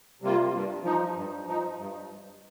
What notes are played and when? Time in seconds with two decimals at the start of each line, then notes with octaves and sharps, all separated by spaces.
0.22 C3 G3 A#3 F4
0.54 G2
0.84 F3 D#4
1.15 G2
1.46 F3 D#4
1.78 G2